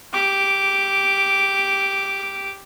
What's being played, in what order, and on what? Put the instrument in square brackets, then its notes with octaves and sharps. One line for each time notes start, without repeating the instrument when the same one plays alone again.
[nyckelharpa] G4 D6